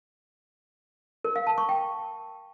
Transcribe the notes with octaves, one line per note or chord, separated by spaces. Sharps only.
A#4
F5
A5
C#6
G5